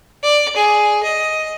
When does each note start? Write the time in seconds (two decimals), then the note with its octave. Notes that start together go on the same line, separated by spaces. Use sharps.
0.23 D5
0.57 G#4
1.03 D#5